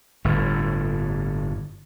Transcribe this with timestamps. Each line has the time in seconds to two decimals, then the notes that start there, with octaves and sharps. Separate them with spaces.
0.25 G1 A2